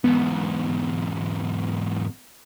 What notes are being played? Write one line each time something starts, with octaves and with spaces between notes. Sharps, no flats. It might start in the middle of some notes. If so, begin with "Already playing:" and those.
E2 G#2 B3